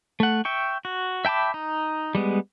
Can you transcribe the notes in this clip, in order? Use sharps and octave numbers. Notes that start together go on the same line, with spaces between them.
A3 F#5
E5 G5 C#6
F#4
E5 G5 A5 B5 D6
D#4
G3 G#3 B3